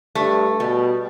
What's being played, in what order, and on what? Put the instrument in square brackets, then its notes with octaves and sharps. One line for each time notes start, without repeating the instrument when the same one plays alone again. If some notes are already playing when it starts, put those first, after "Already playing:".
[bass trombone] G2 [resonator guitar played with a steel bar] A3
[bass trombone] B2 [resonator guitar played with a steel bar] G3